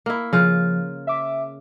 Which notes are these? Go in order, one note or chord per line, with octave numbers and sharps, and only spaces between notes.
A#3 E4
C#3 F3 F4
E5 D6